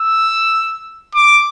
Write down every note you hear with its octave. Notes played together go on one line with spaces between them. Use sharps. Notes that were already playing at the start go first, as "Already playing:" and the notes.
Already playing: E6
D6